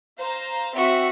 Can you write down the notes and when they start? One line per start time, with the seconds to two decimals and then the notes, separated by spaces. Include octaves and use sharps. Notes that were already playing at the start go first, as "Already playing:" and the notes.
0.18 C5 F5 A#5
0.77 C4 F#4 E5 B6